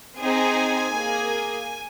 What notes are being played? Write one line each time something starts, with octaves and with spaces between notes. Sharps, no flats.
C4 D#4 G#4 G#5
A#3 G#4